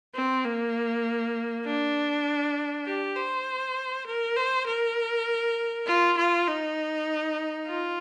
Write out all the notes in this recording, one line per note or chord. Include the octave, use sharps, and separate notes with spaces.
C4
A#3
D4
G4
C5
A#4
C5
A#4
F4
F4
D#4
F4